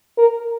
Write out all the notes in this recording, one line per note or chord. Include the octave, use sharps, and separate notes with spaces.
A#4